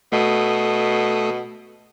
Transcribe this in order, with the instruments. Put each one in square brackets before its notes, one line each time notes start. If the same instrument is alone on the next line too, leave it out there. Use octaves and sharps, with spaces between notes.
[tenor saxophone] B2 [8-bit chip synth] A3 A4 D#6